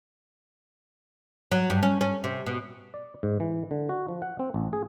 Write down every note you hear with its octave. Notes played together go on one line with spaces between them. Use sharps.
F#3
G2
C#4
C#4
C3
B2
D5
G#2
E3
D3
F#4
F3
F#5
C4
A1
G#4